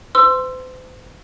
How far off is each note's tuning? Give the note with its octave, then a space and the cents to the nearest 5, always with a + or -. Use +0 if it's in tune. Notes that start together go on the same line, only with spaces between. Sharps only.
C5 -40 C6 +0 E6 +25